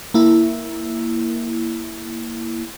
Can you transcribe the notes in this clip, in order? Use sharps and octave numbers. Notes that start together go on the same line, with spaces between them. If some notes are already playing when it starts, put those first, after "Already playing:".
A#3 E4